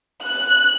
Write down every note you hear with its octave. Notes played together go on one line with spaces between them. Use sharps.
F#6